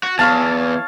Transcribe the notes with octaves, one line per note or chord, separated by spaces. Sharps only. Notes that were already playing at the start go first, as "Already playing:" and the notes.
F#4
E2 C#5 F5 A5